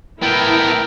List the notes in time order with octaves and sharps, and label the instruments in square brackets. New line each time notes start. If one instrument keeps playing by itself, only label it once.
[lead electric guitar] A2 B3 [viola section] E4 [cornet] A#4 [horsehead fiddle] G5